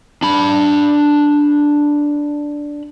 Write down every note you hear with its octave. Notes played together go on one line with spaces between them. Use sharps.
D4 B5